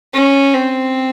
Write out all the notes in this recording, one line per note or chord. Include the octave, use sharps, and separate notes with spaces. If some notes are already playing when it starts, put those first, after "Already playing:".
C#4
C4